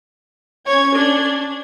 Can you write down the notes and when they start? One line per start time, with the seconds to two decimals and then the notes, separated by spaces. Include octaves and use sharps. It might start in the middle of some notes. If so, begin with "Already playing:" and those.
0.66 C#4 C#5 G#6
0.95 D4